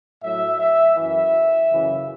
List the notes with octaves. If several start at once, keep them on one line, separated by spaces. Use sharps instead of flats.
A2 F#3 E5
E5
F#2 E3 E5
F#2 C#3 E3